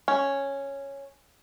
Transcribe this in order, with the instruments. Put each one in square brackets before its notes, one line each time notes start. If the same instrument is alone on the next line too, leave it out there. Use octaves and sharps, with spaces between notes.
[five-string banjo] C#4